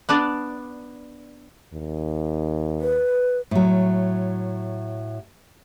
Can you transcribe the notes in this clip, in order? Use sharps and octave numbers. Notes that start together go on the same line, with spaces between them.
B3 D4 D5
D#2
B4
A2 F#3